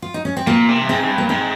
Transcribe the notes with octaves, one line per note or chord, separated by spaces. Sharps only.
F4
D#4
C#4
C4
A#2 A#3
C3
G2
G#2 C4
G#2
G2
A#3
G#2 C4